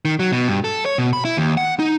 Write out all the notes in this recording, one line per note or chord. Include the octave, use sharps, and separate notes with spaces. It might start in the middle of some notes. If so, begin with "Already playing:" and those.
D#3
F#3
B2
G2
A4
C#5
B2
B5
E4
D#2
F#5
D#4